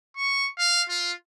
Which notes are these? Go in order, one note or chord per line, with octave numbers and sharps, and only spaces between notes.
C#6
F5
F4